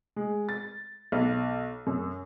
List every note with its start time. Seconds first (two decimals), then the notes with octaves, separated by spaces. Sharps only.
0.16 G#3
0.49 A6
1.12 B1
1.87 F#2